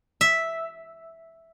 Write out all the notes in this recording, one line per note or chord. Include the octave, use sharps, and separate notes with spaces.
E5